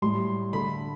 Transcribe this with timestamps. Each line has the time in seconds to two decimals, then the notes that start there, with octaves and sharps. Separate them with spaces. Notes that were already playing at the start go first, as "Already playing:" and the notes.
0.02 A2 G3 C6
0.53 D3 A3 B5